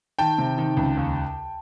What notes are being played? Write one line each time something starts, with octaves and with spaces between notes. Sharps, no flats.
D#3 G5 A5
C3
D#3
C#2
D#2